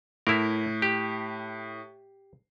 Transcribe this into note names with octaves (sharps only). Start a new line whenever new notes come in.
A2 E4 A#4
G4